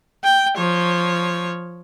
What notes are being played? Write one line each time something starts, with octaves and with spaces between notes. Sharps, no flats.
G5
F3 C#5